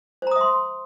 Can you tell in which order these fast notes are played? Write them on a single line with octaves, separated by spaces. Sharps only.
C5 A#5 D#6 E5 C6